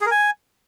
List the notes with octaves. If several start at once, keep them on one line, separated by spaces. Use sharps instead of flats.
G#4
A#4
G#5